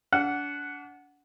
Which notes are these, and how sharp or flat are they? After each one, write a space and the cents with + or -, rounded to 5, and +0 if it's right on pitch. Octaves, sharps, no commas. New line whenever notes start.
D4 -35 F#5 +0